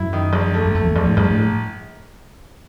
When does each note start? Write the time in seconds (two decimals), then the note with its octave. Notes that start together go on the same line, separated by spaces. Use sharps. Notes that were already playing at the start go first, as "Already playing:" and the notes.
Already playing: F#2 E4
0.13 D#3
0.33 A#1
0.54 A3
0.66 F#2
0.75 F2 A3
0.85 E2
0.95 A#1 F2
1.06 A2
1.17 A#1 G2
1.31 A2